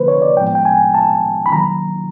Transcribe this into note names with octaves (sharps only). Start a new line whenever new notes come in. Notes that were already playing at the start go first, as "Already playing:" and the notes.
Already playing: D3 F3 A#3 B4 C5
C#5
D5
A2 F3 G#3 B3 G5
G5
G#5
A5
B5
D#3 F#3 A#3 A#5